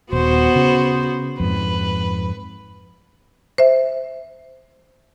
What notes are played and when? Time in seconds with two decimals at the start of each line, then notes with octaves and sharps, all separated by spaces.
0.13 D#1 B3 F#4 C5
0.55 C#3
1.40 F2 G#2 B4
3.58 C5 E5